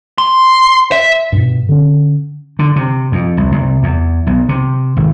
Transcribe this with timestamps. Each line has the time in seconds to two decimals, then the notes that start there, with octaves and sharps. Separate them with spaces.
0.18 C6
0.92 E5
1.32 G2 B2
1.69 D3 C#4
2.59 D3
2.76 C3
3.12 F2
3.37 C2
3.52 C2
3.83 E2
4.27 B1
4.49 C3
4.97 G#1